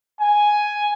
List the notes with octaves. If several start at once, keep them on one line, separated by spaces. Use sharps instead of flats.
G#5